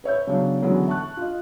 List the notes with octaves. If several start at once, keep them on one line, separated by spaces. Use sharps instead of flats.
B4 C#5 E5 G6
C#3 F#3 B3 D4
D3 E3 F#3 G#3 B3 C#4
E5 A5 C#6 F#6
F4 D#5